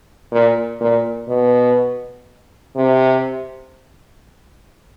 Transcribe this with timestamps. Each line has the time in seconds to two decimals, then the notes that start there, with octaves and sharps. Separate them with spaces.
0.32 A#2
0.81 A#2
1.29 B2
2.75 C3